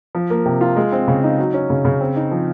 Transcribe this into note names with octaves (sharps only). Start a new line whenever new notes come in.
F3
A#3
C3
F4
G#3
C4
C#3
D#4
F#3
C#4
C#3
C#3
C4
D#4
F3